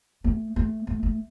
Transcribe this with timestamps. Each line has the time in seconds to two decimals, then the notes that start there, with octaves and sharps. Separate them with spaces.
0.24 A3
0.56 A3
0.87 A3
1.03 A3